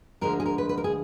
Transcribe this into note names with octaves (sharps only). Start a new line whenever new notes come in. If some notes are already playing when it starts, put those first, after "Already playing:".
D2 D3 F3 G#3 A#4
G#4
A#4
B4
B4
A#4
G#4